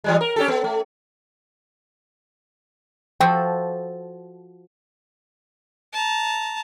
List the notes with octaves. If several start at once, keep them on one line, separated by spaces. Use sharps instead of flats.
E3 G3 G#3
A#4
C#4 G4 A4
B3
A3
F3 F#4 A4 G5
A5 A#5